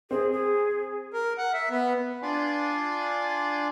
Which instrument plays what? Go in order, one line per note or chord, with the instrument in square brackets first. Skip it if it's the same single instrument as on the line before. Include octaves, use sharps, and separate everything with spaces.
[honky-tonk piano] C4 [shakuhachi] G#4
[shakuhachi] G#4
[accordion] A#4
F#5
E5
B3
D4 F4 D5 G#5 C6 D6